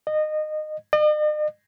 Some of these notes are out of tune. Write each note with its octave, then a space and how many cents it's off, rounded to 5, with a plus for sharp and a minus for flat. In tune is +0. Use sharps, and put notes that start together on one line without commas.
D#5 -20
D#5 -45